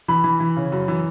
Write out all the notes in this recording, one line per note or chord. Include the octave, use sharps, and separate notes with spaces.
E3 B5
E3
E3
C#3
F#2
E3